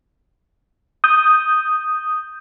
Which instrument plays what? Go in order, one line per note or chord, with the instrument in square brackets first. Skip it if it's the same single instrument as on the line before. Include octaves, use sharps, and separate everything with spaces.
[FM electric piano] D#6 G6